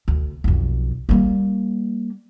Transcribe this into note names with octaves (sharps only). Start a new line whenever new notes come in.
D2
B1 F2
G3 A#3